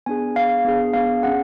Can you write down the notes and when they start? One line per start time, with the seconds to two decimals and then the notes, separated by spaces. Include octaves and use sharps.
0.06 B3 D4 G#4 G#5
0.36 B3 D4 G#4 F5
0.65 B3 D4 G#4
0.93 B3 D4 G#4 F5
1.23 C#4 G#4 F#5